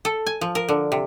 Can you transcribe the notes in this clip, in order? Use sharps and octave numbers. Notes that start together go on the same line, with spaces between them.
A4
G#5
F3
A#4
D3
C3